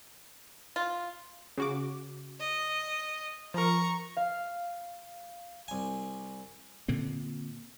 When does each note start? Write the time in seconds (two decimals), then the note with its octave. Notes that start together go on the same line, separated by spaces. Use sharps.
0.76 F4
1.58 C#3 F#4 D6
2.40 D#5
3.54 F3 A#4 A#5 C#6
4.17 F5
5.68 C2 G#5
6.88 A#2 D3 C4